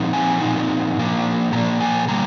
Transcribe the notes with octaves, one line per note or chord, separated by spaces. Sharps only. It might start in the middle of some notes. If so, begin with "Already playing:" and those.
Already playing: A#2 F3 C4 D#4
G#5
A#2 F3 C4 D#4
A#2 F3 A#3 D4
A#2 F3 A#3 D4 A#5
G#5
D3 G3 A#3 A#5